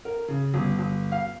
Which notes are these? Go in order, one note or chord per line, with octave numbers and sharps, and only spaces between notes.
A#4
C#3
G1
G1
F5